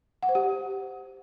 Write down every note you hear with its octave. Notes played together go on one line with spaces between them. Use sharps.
F#5
C5
G4